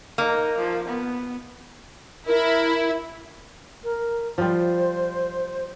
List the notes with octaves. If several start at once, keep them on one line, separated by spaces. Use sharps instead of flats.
A#3 D#4
F3
B3
E4 A#4
A#4
F3 G3 C5